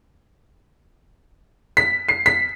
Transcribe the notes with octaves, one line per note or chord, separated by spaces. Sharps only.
B6
C7
B6